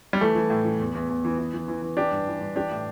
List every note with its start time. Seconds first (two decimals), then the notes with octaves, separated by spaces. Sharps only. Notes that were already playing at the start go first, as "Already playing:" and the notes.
0.13 G3
0.21 E3 A3
0.35 E3
0.50 A2
0.65 E3
0.80 E2
0.95 E2
1.09 E2
1.25 E3
1.38 E3
1.54 E3
1.68 E3
1.82 E3
1.97 E3 D4 G4
2.12 G2
2.27 E3
2.41 G2
2.56 E3 D4 G4
2.71 A2